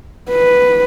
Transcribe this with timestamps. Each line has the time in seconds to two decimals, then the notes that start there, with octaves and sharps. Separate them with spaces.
0.31 B4